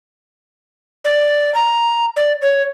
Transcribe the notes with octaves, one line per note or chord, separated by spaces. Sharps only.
D5
A#5
D5
C#5